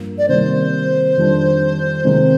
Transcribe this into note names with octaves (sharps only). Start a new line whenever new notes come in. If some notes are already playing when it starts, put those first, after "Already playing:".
Already playing: G2 F3 A#3
D5
C3 D#3 G3 A#3 D#4 C5
F2 D#3 G3 D4
C3 D#3 G#3 C4